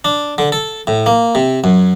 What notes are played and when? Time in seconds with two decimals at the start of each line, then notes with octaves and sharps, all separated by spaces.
0.05 D4
0.38 D3
0.52 A4
0.87 A2
1.06 A#3
1.35 C3
1.64 F#2